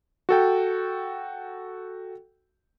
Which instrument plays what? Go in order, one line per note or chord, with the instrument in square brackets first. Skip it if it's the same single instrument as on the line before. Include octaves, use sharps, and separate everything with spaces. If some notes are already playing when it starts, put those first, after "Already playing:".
[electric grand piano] F#4 A4 G5